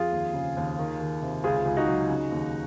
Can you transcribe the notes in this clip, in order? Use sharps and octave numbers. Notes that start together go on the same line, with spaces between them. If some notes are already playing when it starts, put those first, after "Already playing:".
Already playing: F2 F4 G#4
D#2
C#3
D#2
D#3
D#3
C3
C#2 F4 G#4
C#2
D#4 F#4
F#3
C#3
D#2